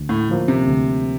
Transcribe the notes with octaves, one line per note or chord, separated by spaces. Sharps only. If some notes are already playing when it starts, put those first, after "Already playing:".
Already playing: D2
A2
D3 F3 A#3
C3
D2